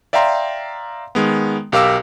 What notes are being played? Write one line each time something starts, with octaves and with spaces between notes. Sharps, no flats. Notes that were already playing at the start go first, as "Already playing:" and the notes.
D5 E5 F5 G5 A#5 C6
D#3 G#3 B3
B1 G4 A#4 F5 D6 E6